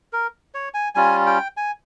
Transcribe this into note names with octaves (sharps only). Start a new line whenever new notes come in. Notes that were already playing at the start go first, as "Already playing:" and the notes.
A#4
C#5
G#5
G3 C#4 F4 G#5
G5
G#5